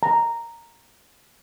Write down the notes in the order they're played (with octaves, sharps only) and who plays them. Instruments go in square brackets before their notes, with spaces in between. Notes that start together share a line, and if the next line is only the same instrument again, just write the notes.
[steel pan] A#5